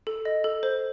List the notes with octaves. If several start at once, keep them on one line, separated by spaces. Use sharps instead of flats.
A4
D#5
A4
C5